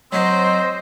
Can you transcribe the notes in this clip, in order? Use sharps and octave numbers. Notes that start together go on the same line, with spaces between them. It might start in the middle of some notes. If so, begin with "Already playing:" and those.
F#3 C4 C5 D#5